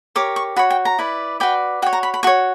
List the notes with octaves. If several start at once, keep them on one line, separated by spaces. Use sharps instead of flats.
G4 A#4 C#5 D6
C#6
F#4 C#5 B5
G5
A#5
E4 B4 D5
F#4 B4 D5 G5
F#4 C#5 G5
A#5
B5
B5
F#4 C#5 C#6